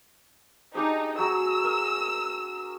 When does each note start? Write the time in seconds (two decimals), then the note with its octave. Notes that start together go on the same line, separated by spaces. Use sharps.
0.75 D4 D#4 G4 G#4
1.19 F#3 G#4 A#5 E6
1.64 A#4